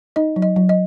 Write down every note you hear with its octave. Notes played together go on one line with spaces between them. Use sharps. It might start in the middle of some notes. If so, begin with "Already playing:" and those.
D#4 D#5
F#3
D#5
F#3
D#5